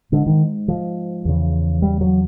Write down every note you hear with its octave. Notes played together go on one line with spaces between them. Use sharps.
G#2 D3
D#3
F3
E2 C#3
G3
F#3